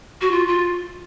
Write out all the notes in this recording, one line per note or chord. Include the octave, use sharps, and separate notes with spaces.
F#4
F4
F4